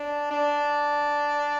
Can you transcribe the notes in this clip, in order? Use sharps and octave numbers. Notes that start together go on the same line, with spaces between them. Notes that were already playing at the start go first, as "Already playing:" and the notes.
Already playing: D4
D4